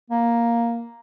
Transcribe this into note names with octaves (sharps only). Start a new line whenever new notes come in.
A#3